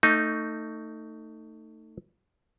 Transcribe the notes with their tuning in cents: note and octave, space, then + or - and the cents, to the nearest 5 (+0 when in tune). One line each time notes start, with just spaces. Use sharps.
A3 +25 D#4 +0